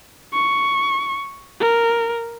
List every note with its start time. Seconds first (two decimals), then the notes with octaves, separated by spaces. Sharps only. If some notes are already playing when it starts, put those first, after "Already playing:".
0.34 C#6
1.61 A#4